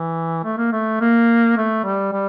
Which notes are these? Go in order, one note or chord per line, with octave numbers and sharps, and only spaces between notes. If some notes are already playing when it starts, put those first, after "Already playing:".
Already playing: E3
A3
A#3
A3
A#3
A3
G3
G3